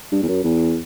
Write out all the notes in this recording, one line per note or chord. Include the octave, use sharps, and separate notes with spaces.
G2
E2
F#2
E2